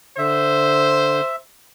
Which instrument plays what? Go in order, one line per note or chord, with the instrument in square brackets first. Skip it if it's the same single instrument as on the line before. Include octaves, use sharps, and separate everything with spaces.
[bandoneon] D3 [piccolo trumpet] C5 [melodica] E5